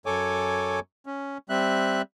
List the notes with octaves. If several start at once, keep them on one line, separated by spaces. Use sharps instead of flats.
F#2 A4 C#5 G#5 D6
C#4
G3 C4 E5 F#6